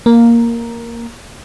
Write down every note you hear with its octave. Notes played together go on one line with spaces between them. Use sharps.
A#3